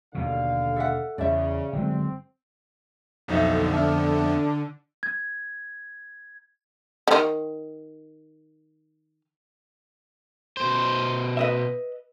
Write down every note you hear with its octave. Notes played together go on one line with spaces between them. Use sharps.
D#2 B2 D3 F5
A4 E5 F#5
E2 C#3 D5 E5
G1 F#3 G#3 C4
B1 F2 D3 F3 B3 D#4 E5
D4 E5 F6
G#6
D3 D#3
B2 C5
B4 D#5 E5